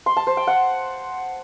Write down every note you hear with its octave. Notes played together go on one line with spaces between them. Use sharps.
C6
A5
C5
G5
F#5